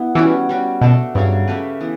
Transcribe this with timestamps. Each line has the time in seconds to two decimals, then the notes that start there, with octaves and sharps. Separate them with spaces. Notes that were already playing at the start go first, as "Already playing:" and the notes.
Already playing: B3 E4
0.15 E3 G3 C#4 F#4
0.49 G3 C#4 F#4
0.81 B2 A3 D4 F#4 A4
1.15 G2 C#3 F#3 C#4 F#4
1.47 A3 C#4 G4 B4
1.81 E3 B3